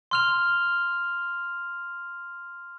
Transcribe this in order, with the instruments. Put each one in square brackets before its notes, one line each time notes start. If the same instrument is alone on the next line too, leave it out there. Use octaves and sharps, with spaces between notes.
[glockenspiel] C6 F6 F7